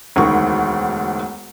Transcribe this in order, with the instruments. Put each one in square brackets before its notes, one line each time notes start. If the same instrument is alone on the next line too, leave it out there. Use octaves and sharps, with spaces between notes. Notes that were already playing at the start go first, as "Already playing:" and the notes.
[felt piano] E1 D2 D#3 C#6